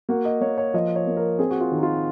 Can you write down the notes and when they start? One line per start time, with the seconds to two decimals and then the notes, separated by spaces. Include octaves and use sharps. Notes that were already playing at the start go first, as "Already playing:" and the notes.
0.09 A#3 F#4
0.25 D#5
0.41 A#3 C#5
0.58 C#5
0.74 F3 D#5
0.96 C#5
1.07 A#3
1.17 A#4
1.38 C4 G#4
1.51 F#4
1.60 F4
1.71 D#3
1.78 D#4
1.83 F4